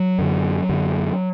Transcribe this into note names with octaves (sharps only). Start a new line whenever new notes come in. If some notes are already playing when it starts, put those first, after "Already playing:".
Already playing: F#3
F#2 D3
F#2 D3